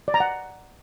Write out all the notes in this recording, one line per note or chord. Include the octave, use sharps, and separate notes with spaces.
D5
A#5
F#5